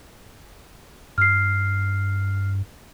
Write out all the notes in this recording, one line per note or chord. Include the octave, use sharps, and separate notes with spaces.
G2 F6 C7